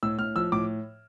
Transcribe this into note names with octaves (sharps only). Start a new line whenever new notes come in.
A2 E6
A2 F6
F3 E6
A2 D6